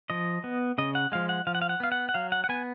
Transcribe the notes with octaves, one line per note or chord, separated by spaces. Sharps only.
F3 D#5
B3
C#3 D#5
F#5
F3 G#3 F5
F#5
F3 F5
F#5
F5
F#5
B3 F5
F#5
F#5
F#3 F5
F#5
F#5
B3 G#5